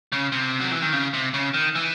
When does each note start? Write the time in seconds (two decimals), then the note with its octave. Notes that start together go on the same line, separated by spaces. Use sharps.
0.12 C#3
0.32 C3
0.60 F#3
0.71 E3
0.82 D#3
0.93 C#3
1.13 C3
1.34 C#3
1.54 D#3
1.75 E3